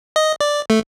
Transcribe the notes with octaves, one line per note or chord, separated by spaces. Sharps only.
D#5
D5
A3